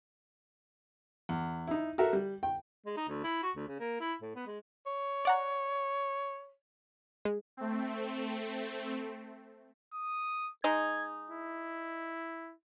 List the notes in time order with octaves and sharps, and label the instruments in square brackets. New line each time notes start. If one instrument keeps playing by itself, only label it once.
[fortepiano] E2
D#4 E4
F#4 A4 A#4 E5
G3
G5
[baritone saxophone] G#3
D#4
D2
E4
F#4
D2
C#3
A#3
E4
A2
B3
G#3
[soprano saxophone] C#5
[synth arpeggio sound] D5 F#5 A#5
G#3
[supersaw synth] A3 C4
[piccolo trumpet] D#6
[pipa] G#3 D#4 [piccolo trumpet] G#6
[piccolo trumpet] E4